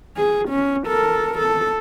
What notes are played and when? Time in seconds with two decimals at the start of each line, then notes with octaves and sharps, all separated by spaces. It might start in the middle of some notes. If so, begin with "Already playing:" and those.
0.17 G#4
0.49 C#4
0.87 A4 A#4
1.38 A4